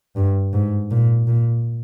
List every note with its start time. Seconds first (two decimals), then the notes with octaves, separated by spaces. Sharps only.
0.16 G2
0.53 G#2
0.91 A#2
1.28 A#2